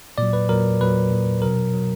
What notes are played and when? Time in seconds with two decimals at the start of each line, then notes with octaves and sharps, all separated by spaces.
0.18 A#2 F#3 D5
0.33 B4
0.49 A#2 F#3 A#4
0.81 A#2 F#3 B4
1.11 A#2 F#3
1.42 B2 F#3 A#4
1.74 B2 F#3